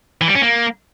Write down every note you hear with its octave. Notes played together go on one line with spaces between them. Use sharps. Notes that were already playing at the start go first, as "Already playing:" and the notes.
E3
G3
C#4
A#3